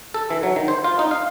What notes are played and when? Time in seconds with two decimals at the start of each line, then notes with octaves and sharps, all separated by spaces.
0.14 A4
0.30 E3
0.43 F#3
0.56 D#3
0.68 C5
0.84 F4
0.99 D#4
1.11 F5